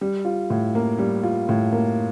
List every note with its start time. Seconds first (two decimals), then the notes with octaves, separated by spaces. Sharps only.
0.01 G3
0.25 F4
0.50 A2
0.75 A#3
0.98 G3
1.23 F4
1.49 A2
1.72 A#3